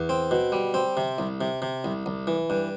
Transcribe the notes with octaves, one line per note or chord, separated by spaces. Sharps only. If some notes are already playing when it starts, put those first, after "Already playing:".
Already playing: E2
C4
B2
G3
C4
C3
C2
C3
C3
C2
C2
E3
G2